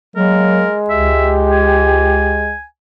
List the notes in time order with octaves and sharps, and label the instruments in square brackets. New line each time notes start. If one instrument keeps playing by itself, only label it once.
[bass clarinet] F#3 [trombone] G#3 [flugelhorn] A#3 [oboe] A#4
[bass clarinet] C#2 [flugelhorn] G4 [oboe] E5
[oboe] G#5